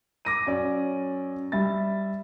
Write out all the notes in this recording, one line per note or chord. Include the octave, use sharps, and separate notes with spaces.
D6 A#6 D#7
F#2 C#4 D5
G3 E5 B5 A6